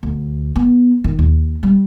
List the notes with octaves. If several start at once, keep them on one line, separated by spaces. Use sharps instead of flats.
D2
B3
D#3
D#2
G3